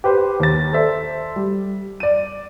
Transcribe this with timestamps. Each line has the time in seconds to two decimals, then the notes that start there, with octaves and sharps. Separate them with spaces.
0.04 G4 B4 C5
0.40 D#2 A6
0.73 A4 C5 D5 E5
1.36 G3
2.00 D5 D#7